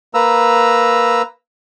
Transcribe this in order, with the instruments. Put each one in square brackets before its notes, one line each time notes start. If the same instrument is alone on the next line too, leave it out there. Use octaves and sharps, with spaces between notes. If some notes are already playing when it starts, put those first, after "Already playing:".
[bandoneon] A#3 B4 A#5 E6